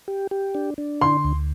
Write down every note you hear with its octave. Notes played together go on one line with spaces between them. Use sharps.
G4
G4
D4
D4
D3 C6
D2